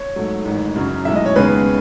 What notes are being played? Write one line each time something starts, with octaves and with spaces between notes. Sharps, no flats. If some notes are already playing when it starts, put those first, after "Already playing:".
Already playing: C#5
G#2 F#3 A3
A1 G#2 D#3
F#2 C#3 F#3 C#4
B1 A2 G#3 E5
D#5
C#5
D#2 C#3 G#3 B3 B4